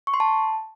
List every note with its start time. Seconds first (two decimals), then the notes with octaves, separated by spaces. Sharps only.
0.07 C#6
0.14 C6
0.20 A5